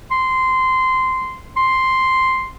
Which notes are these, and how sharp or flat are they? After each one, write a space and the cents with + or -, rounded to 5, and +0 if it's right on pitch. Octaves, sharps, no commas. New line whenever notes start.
C6 -15
C6 +0